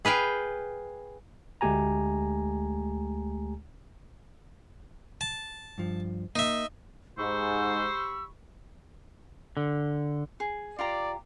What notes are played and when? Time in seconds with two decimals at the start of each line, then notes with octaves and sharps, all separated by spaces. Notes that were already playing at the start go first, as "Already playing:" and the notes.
0.05 G#4 B4 F5 G5
1.61 D2 G#3 A3 G4 G#5 A#5
5.21 A5
5.78 G2 F3
6.36 A#3 D#4 D#5 E5
7.18 G#2 G4 C5 B5 C#6 E6
9.57 D3
10.40 G#4
10.79 F4 G4 D5 A#5